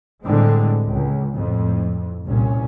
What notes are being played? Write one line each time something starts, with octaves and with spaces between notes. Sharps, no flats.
A2 D3 G3 G#3 C4
C#2
F2 A2
C2 A#2 C#4